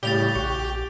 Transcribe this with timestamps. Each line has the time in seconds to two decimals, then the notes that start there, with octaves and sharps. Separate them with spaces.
0.03 A2 C#3 G3 G4 A6 F7 G7
0.35 A#1 F#4